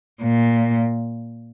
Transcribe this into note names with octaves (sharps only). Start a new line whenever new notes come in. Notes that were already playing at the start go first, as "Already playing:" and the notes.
A#2